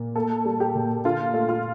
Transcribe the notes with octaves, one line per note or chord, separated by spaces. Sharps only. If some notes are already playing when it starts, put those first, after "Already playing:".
Already playing: A#2
A#3 A4
G3
G4
A#2
D3 F4
A3
F4